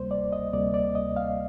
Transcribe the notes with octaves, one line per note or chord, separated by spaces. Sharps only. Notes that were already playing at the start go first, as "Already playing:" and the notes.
Already playing: D2 C3 G3 A#3 C5
D5
D#5
D2 C3 G3 A#3 D5
D5
D#5
F5